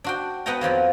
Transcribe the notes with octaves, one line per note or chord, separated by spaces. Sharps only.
D4 F#4 G5
B3 B4 D#5 F#5 G5 A#5
F2 F3 F#3 A#3